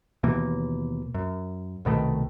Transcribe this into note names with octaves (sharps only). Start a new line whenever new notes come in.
D#2 B2 E3 A#3
F#2
C2 B2 D#3 A3